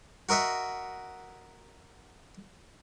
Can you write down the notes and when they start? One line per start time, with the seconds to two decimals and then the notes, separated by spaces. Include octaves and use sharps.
0.29 F#4 A#4 D#5 E5 F#5